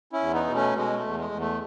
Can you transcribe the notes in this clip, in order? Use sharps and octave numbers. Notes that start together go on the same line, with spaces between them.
C#4 E4
E2
B3 D#4
B2
A3 C#4
B2 G#3
A3
E2
G#3
E2
A3